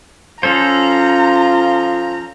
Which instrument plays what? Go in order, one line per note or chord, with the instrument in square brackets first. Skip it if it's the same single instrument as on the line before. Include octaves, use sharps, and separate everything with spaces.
[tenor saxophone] F3 [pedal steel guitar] C#4 A4 C5 [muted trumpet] F4 [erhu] A#5